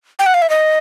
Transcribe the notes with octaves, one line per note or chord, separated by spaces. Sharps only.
G5
F#5
F5
E5
D#5